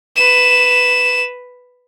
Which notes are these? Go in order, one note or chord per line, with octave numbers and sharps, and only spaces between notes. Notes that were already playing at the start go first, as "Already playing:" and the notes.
B4 E7